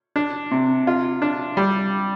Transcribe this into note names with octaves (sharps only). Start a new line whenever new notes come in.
D4
C3
F4
D4
G3